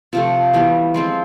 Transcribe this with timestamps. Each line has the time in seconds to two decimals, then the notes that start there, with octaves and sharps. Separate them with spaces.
0.13 C3 F3 A3 F4
0.53 E3 G3 B3
0.94 F3 G#3 C4 F4